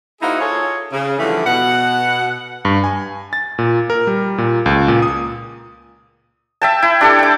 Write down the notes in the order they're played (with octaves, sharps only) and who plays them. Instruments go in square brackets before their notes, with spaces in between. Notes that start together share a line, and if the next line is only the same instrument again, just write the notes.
[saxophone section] A#3 D#4 E4 F#4 G#4 C5
F4 G#4 A4 C#5
C#3
D3 E3 F3 G3 A3
B2 F#5
[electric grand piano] G2
G#5
A6
A#2
A#4
G3
A#2
C#2
A#2
D#6
[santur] E5 G5 A5
E4
D4 G4 A4
G5 D6